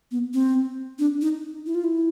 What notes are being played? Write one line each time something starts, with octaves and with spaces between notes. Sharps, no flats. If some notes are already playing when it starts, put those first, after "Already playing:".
B3
C4
D4
D#4
E4
F4
E4